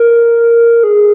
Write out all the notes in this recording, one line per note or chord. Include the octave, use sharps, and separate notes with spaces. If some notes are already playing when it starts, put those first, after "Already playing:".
Already playing: A#4
G#4